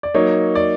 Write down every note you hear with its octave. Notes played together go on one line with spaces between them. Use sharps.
D5
F#3 A#3 D#4 C#5
D5